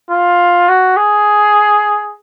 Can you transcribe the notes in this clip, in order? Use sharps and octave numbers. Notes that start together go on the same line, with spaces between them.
F4
F#4
G#4